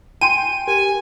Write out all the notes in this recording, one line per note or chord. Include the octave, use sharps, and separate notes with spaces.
G5 G#5 C6 D#7
G4 A#4 G#5